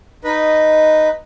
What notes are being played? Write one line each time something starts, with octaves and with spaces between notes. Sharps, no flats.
D#4 B4 D#5